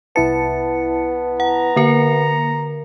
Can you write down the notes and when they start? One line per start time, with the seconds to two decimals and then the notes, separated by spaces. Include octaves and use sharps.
0.16 C2 B3 E4 A5 C#7
1.40 F#5 A#5
1.76 D3 A#3 A#4 C#7